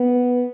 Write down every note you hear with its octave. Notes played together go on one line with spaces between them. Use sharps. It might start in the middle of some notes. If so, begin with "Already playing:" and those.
Already playing: B3